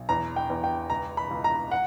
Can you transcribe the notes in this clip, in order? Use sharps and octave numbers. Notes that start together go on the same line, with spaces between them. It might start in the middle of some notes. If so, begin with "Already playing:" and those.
Already playing: B1
E2 A#5
G5
E2
G5
C#2 A#5
B5
C#2
A#5
F#5